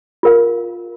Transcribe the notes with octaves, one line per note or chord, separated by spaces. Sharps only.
F4 A#4 F5